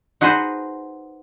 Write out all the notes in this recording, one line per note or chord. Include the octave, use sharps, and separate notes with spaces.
D#4 F#4 G#4 B4 C5